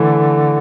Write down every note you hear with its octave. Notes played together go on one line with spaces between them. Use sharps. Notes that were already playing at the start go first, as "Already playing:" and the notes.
Already playing: D3 E3 A3